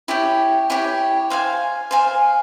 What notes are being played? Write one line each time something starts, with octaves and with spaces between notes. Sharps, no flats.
E4 G4 C#5 G5
E4 G4 C#5 G5
C5 F5 G#5
C5 F5 G#5